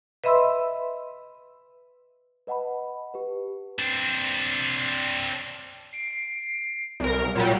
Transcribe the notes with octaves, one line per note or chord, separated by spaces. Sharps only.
B4 D#5 E5 B5 C6 E6
B4 D#5 F#5 A5 B5
G4 B4
C4 D4
C7 D7
C2 A#4
A#2 F#3 G3